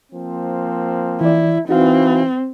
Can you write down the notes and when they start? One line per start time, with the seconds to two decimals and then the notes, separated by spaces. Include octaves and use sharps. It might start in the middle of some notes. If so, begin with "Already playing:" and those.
0.12 F3 A#3 C4
1.21 E3 E4 D5
1.69 E3 C4 D#4 F#4 F5